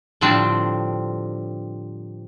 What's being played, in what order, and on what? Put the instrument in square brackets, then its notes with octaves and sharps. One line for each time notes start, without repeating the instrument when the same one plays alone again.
[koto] A2 D3 F3 G3 C4 D4